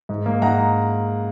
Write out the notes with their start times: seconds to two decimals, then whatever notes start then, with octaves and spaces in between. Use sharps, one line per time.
0.09 G#2
0.26 A#3
0.42 G#2 F#5 A#5